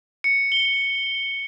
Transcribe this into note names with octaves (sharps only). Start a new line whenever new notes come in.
C#7
G7